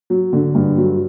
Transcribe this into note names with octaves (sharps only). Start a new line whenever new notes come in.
F#3
D3
G2
F#3